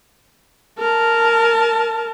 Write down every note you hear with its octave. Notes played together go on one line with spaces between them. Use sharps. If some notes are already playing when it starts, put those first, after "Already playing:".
A#4 A5